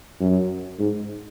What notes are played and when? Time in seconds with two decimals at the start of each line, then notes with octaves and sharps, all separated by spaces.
0.20 F#2
0.79 G#2